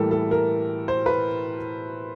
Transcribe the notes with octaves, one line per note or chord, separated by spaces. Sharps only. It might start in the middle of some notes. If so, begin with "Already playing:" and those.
Already playing: A2 E3 G3 A#3 A4 A#4
A4
A#4
C5
B4